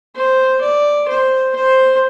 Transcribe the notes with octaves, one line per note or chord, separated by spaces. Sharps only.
C5
D5
C5
C5